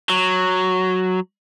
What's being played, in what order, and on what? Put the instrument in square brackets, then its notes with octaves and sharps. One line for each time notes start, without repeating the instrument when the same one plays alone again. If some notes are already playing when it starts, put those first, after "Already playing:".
[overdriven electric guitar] F#3